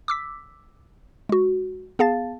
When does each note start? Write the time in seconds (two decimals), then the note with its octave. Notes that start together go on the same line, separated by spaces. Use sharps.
0.08 D6 E6 B6
1.29 G#3 F#4
1.99 B3 G#4 F5 A5 A6